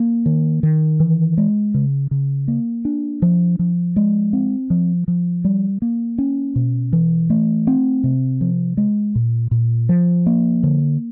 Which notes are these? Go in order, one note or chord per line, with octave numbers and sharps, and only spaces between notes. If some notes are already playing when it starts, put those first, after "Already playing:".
Already playing: A#3
D#3
D#3
E3
G#3
C#3
C#3
A#3
D4
F3
F3
G#3
C4
F3
F3
G3
A#3
C#4
B2
E3
A3
C4
C3
F3
G#3
A#2
A#2
F3
A#3
D3